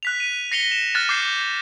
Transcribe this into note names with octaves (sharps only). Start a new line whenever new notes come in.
F#6 B6 F7
D#7
A#6 C7 C#7 F7 G7
E7
F6 F#6 A6 F7
D6 G6 C7